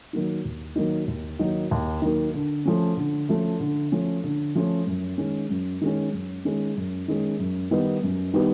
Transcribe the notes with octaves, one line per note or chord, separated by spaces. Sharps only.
D#3 F#3 A#3 D#4
D#2
D#3 F#3 A#3 D#4
D#2
D#3 F#3 A#3 D#4
D#2
D#3 F#3 A#3 D#4
D3
F3 A3 C#4
D3
F3 A3 C#4
D3
F3 A3 C#4
D3
F3 A3 C#4
F#2
D#3 G#3 C#4
F#2
D#3 G#3 C#4
F#2
D#3 G#3 C#4
F#2
D#3 G#3 C#4
F#2
D#3 G3 B3 D#4
F#2
D#3 G3 B3 D#4